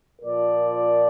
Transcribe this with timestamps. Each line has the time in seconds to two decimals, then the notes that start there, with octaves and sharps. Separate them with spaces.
0.22 A#2 F3 A#4 D5